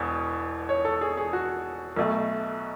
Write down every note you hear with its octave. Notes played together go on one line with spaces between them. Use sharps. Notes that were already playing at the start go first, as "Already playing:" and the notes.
Already playing: E1 E2 B2
C#5
A4
G#4
G#4
F#4
B1 B2 A3